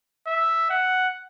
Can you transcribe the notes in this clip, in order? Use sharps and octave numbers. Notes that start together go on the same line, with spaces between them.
E5
F#5